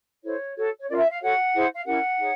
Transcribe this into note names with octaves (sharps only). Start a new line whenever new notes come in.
E4 A4 C5 C#5
F#4 A4 C#5
C#5
C#4 F4 A#4 D5 F5
E5
F5
F#4 A4 C#5 F#5
E4 G#4 C5
F5
C#4 E4 G4 A#4 F#5
D#4 G#4 C#5